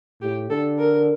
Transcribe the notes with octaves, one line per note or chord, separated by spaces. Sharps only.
A2 G4
D3 A4
A#4